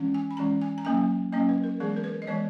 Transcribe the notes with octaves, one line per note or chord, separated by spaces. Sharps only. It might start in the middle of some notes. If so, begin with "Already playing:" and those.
Already playing: E3 G#3 C#4
G#5
B5
E3 G#3 C#4 A#5
G#5
A#5
F#3 A#3 C#4 G#5
F#3 A#3 C#4 D#5
B4
A#4
E3 G#3 B3 G#4
A#4
B4
D#5
E3 G#3 B3 C#5